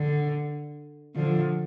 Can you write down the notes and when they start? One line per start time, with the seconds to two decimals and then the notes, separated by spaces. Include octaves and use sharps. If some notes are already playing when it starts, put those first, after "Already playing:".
Already playing: D3
1.15 D3 F3